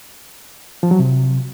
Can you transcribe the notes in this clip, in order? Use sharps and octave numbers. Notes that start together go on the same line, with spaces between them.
F3
F#3
C3